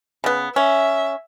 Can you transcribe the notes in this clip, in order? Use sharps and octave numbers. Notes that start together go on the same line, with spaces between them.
C#3 B3
C#4 E5